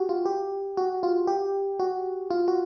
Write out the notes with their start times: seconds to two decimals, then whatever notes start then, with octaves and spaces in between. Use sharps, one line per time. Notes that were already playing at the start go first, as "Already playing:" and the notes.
Already playing: F#4 G4
0.09 F4
0.26 G4
0.77 F#4
1.03 F4
1.27 G4
1.79 F#4
2.30 F4
2.48 F#4